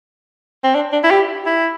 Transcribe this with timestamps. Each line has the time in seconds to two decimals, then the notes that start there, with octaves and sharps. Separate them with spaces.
0.64 C4
0.75 D4
0.93 D4
1.04 E4
1.11 G4
1.46 E4